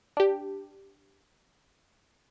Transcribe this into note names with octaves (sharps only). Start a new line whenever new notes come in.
D4 G4